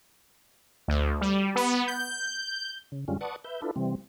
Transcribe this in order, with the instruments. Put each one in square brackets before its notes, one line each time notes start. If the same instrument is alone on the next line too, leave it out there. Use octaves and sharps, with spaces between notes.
[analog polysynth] D2
G3
B3
G6
[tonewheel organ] C#3
F#2 D3 G3 G#3 C#4 F4
B4 D5 F#5 A5 C#6 D#6
B4 E5 G6
D4 E4 F4 A4 B4
C3 E3 G3 C4